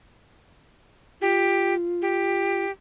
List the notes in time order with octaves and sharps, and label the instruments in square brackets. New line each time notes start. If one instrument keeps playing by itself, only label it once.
[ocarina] F4 [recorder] G4
[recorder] G4